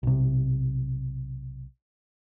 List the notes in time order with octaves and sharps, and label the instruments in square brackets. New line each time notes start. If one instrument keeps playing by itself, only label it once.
[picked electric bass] B1 C3